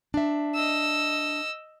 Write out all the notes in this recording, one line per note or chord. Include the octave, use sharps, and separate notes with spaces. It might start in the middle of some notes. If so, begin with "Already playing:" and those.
D4 E5
D#5 E6